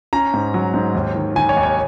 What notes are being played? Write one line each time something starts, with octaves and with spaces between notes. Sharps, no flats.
C#4 A#5
G#2
F#3
G#2
D#2
D#3
D#3 G#5
C#5
D#2
C#5